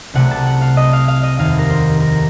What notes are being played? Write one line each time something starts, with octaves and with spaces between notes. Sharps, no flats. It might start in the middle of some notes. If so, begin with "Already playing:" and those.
C2 C3 F#3 A3 F#5
A5
F#5
F5
D#5
F5
F5
D#5
F1 D#2 D#3 F5
A#4
C5
A#4